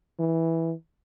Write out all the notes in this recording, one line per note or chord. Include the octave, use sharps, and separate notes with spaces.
E3